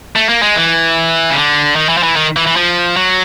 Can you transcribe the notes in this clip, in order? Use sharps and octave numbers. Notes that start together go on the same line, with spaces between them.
A3
A#3
G#3
E3
C#3
D3
D#3
E3
F3
E3
D#3
E3
E3
F3
F#3